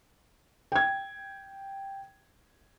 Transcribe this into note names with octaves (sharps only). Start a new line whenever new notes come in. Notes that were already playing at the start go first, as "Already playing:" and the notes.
G5 G#6